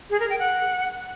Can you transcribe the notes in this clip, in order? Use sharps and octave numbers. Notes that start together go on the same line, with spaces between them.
G#4
A#4
G5
F#5